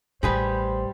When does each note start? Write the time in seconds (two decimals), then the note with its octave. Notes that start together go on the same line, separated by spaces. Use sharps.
0.23 A1 A2 G3 G#4 B4 C5